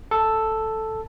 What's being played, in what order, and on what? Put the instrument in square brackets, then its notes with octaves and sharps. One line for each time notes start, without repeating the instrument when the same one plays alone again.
[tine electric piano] A4